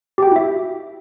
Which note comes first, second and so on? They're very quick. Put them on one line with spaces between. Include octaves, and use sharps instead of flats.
G4 G5 F#4 E4 E5